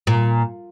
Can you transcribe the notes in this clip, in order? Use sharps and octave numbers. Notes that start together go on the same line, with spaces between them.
A#2